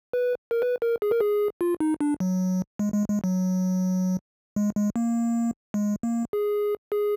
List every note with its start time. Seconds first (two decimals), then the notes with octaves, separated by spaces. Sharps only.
0.13 B4
0.51 A#4
0.62 B4
0.82 A#4
1.02 G#4
1.11 A#4
1.21 G#4
1.61 F4
1.80 D#4
2.01 D4
2.20 F#3
2.79 G#3
2.94 G#3
3.09 G#3
3.24 F#3
4.56 G#3
4.75 G#3
4.96 A#3
5.74 G#3
6.03 A#3
6.33 G#4
6.92 G#4